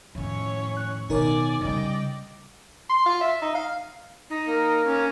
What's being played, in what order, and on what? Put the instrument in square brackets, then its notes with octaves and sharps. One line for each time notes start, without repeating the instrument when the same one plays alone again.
[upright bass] F2 D#3 [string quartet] A2 C#4 C#5
[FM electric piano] F#6
[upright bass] B2 D#3 [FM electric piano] D#4 A#4 C#5 [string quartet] D5 G#5
[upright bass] C#3 G3 [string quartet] D5 D#5 G5
[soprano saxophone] C6
F4
E5
D#4
F5
[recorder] D#4
[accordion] A#3
[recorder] C#4